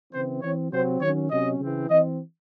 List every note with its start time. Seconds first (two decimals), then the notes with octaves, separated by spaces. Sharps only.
0.13 C#3 E3 C4 C5
0.42 E3 C4 C#5
0.71 C3 F#3 C4 C5
1.01 D#3 F#3 C#4 C#5
1.31 C3 F#3 C#4 D#5
1.60 C#3 E3 C4
1.90 E3 C4 D#5